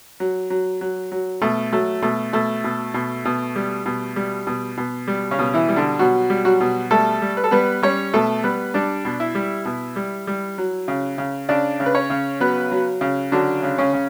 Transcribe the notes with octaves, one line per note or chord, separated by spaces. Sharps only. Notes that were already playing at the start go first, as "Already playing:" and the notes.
F#3
F#3
F#3
F#3
B2 A3
F#3 A3
B2 A3
B2 A3
B2
B2
B2
G3
B2
G3
B2
B2
G3
C#3 C#4
B2
E3 E4
G3
D3 D4
B2 F#3 F#4
G3
F#3 F#4
B2
G3 A3 A4
G3
B4
A4
G3 B3 B4
G3 C#4 C#5
B2 A3 A4
G3 B3 B4
G3 D4 D5
B2
E4 E5
G3
B2
G3
G3
F#3
C#3
C#3
C#3 D4 D5
C#3
B4
C#4 C#5
C#3
F#3 B3 B4
F#3
C#3
D3 F#3 D4
C#3
C#3 C#4
C#3